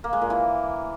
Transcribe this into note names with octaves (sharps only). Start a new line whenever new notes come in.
A#3
G#3
A#2
E3